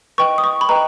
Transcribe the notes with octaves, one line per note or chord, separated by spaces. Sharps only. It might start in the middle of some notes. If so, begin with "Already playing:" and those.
B4 D#5 G5 C#6
D#6
C#6
B5
B4 D#5 G5 A#5